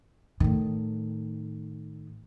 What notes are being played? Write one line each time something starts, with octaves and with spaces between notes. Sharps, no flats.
A2 D#3